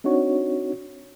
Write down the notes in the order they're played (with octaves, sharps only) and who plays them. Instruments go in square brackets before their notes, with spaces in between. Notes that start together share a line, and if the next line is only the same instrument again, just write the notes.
[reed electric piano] C4 D4 D#4 F#4 C#5